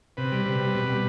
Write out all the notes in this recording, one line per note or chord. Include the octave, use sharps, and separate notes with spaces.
C3 B4
G3
C3
G3
B2
G3